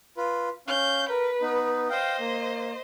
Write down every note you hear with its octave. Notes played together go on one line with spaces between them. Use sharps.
F4 B4
C#4 F5 G6
A#4 B4
B3 D#4
C5 D#5 F5 G5
A#3